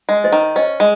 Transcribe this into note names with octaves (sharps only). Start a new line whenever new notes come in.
G#3
C5 D#5
D#3
C#4 C5 D#5
G#3